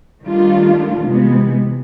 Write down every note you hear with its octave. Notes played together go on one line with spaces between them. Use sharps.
D#3 G3 A3 D4 F4
C3 E3 G#3 B3